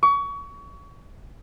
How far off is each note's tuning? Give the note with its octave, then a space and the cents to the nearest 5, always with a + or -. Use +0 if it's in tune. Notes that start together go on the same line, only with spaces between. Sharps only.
C#6 +30